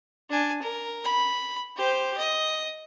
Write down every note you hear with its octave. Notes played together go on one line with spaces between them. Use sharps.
D4 G#5
A#4
B5
G4 C5
D#5